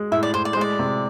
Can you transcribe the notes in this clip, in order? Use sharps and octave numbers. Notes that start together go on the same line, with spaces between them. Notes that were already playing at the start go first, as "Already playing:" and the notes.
Already playing: G#3
A2 E5
D5
A2 C5
D5
C5
G#3 D5
C3